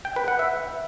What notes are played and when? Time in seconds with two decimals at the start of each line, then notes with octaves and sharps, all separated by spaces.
0.05 G5
0.16 B4
0.28 F#5
0.39 E5